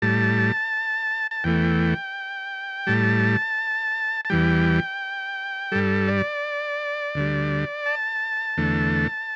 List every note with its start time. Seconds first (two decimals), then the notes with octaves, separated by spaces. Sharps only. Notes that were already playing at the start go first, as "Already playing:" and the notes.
0.02 A2 G3 A5
1.31 A5
1.44 E2 E3 A3 G5
2.87 A2 G3 A5
4.25 A5
4.30 E2 E3 G3 G5
5.72 G2 G3 A4
6.08 D5
7.15 D2 D3 G3
7.86 A5
8.57 E2 D3 A3